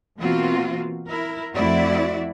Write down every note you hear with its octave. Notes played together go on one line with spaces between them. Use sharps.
B2 E3 A#3 C4 F4 F#4
E4 A#4
F2 A3 C4 E4 F#4 D5